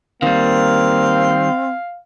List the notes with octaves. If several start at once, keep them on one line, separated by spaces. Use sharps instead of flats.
D#3 G3 A#3 C4 F5